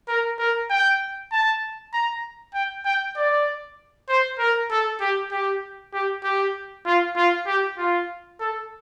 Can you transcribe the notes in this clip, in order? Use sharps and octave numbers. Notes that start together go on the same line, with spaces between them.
A#4
A#4
G5
A5
A#5
G5
G5
D5
C5
A#4
A4
G4
G4
G4
G4
F4
F4
G4
F4
A4